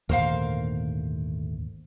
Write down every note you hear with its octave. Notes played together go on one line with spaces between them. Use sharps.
G#1 D#2 A#2 D3 A3 A#4 C5 F5